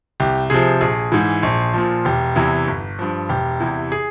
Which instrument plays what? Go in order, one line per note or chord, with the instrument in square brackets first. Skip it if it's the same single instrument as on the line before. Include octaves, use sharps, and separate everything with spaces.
[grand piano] C2 G4
C3 F3 G#4
A#1 G#4
G#2 E3
A#1
A#2 F3
E1 G4
E2 C3 E3
G1
G2 F3
E1 G4
E2 C3 E3
G#4